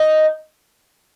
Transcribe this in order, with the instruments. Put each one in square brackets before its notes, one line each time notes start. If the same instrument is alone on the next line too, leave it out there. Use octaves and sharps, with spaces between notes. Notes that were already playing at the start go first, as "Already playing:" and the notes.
Already playing: [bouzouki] D#4